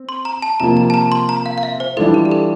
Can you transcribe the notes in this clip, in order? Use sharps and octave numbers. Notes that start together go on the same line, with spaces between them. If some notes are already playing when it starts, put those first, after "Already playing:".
Already playing: C4
C6
A#5
A5
C3 F3 A#3 F4 A#5
A#5
A5
A#5
C6
A#5
F5
F5
E5
C5
E3 G3 D4 F4 A4
G4
G4
A4